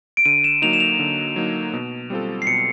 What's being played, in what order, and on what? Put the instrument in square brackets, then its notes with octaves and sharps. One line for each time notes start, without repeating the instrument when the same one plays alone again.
[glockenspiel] D7
[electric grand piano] D3 [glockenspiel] D#7
[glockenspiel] E7
[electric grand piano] F#3 A#3 D#4 [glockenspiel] F7
[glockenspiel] E7
F7
[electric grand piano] D3
F#3 A#3 D#4
B2
G3 C4 F4 A4
[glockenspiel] C7
[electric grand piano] B2 [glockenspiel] C#7